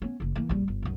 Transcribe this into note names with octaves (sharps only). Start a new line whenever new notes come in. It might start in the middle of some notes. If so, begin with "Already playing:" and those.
B3 C#4
F#1 C#3
E3 A#3
A#1 G3
G1
B1 F#2